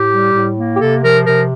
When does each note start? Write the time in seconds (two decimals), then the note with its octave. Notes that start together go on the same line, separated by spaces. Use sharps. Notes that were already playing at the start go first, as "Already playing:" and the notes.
Already playing: A2 G4
0.08 G3
0.32 A2
0.55 A#3
0.74 G4
0.79 C3 A4
1.02 F3 A#4
1.25 C3 A#4